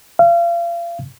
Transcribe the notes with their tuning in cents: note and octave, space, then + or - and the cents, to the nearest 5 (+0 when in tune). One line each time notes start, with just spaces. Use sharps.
F5 -35